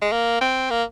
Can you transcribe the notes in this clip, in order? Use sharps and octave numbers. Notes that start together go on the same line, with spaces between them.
G#3
A#3
C4
A#3